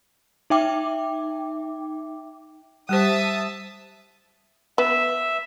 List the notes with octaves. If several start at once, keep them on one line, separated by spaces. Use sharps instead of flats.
D#4 E5 G5 D6
G3 G4 C5 E5 A5 D#6
B3 E5